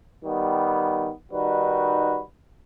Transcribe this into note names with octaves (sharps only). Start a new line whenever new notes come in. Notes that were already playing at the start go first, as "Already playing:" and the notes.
D#3 G3 B3
D#3 G3 D#4 F#4 B4